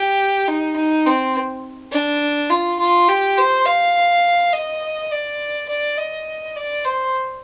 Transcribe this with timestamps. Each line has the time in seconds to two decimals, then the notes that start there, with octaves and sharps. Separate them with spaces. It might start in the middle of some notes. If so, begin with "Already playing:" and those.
Already playing: G4
0.48 D#4
0.76 D#4
1.06 C4
1.92 D4
2.50 F4
2.80 F4
3.08 G4
3.37 C5
3.66 F5
4.53 D#5
5.11 D5
5.69 D5
5.98 D#5
6.56 D5
6.85 C5